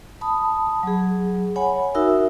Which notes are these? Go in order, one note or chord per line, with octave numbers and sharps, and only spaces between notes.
A5 B5 D#6
F#3 G#4
C#5 F#5 G#5 B5
D#4 F#4 A#4 E5 E6